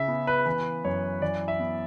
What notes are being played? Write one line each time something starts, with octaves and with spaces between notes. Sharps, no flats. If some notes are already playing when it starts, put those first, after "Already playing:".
Already playing: C#3 E5
B3
B4
E3 B4
F#2 C#5
E3 D5
E5
B3